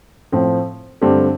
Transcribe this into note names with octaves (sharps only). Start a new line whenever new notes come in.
A2 F3 C4
G2 D3 A3 C4 G4